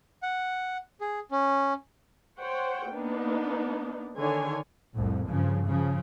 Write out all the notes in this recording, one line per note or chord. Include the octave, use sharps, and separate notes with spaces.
F#5
G#4
C#4
C5 C#5 F#5 G5
A#3 B3 D4 D#4
D3 D#3 D4 C#5 G#5
C2 F2 A2
G2 C#3 F3
C#3 F3